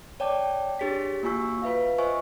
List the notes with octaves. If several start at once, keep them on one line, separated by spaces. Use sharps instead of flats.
C#5 D5 G5 A5 D6
D4 G4 G#4 C#5 B6
A#3 F4 F#4 G#5 C#6 E6
F4 B4 E5 F5
F4 C5 D#5 E5 G#5 C#6